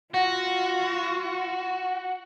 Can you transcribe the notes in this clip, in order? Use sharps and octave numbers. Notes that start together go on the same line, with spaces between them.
F4 F#4 F#5 A#6